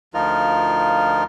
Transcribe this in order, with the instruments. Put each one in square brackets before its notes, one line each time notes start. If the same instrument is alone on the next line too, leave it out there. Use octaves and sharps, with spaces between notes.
[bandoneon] D2 F3 D#4 F4 A#4 F6